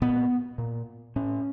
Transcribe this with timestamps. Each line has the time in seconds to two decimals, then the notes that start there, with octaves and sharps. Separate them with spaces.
0.02 A#2 B3
0.58 A#2
1.16 A2 C#4